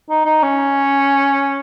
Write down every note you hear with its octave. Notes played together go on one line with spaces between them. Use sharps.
D#4
D#4
C#4